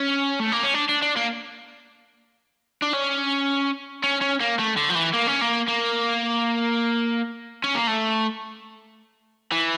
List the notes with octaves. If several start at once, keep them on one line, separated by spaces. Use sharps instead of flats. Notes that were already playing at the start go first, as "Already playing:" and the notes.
Already playing: C#4
A3
A#3
C#4
D4
D4
D4
A#3
D4
C#4
C#4
C#4
A#3
A3
D3
F3
E3
A#3
C#4
A#3
A#3
C#4
A#3
A3
E3